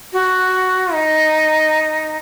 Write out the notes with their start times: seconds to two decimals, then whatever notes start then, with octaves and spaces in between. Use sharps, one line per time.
0.13 F#4
0.94 D#4